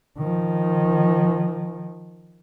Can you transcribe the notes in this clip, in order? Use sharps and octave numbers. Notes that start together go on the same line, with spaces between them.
D#3 F3